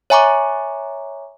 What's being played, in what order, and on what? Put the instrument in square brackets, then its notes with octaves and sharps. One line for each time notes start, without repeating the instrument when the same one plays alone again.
[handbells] C#5 E5 G#5 A#5 C#6 D6